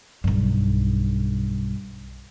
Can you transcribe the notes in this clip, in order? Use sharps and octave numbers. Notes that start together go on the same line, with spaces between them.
B1 G2